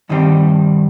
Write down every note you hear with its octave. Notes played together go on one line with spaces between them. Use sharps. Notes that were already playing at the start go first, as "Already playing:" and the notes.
G2 D#3 G3 C4